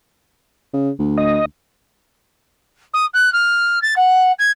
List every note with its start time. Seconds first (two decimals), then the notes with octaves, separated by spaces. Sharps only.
0.74 C#3
0.99 D2
1.18 D#5
2.94 D#6
3.14 F#6
3.33 F6
3.82 A6
3.96 F#5
4.39 G#6